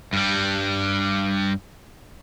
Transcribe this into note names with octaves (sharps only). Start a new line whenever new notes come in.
G2 G3